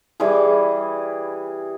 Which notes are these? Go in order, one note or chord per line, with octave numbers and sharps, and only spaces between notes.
E3 G3 G#4